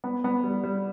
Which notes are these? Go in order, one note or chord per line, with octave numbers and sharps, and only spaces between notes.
B3
B3
G3
G3